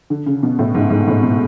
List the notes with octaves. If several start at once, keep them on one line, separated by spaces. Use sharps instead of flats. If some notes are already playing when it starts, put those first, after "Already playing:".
D3
C#3
B2
A2
G#2
G#2
A2
B2